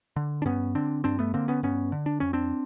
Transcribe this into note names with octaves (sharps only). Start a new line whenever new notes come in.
D3
D4
G2 B3 C#4
D3 C4 D4
G2 C4 D4
A3 B3
D3 A#3 C4
B3 C#4
G2 B3 C#4
D3
D4
F2 C#4
C4 D4